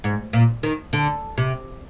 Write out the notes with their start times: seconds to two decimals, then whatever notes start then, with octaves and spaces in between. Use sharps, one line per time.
0.04 G#2
0.33 A#2
0.63 D#3
0.93 D3
1.38 C3